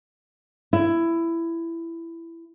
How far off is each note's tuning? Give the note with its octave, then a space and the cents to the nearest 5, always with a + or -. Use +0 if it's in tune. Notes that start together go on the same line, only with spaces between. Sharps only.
E4 +15